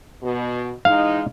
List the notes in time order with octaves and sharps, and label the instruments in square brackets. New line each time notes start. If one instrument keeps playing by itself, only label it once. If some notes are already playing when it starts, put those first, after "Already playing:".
[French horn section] B2
[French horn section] E3 G#3 D#4 [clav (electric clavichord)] F5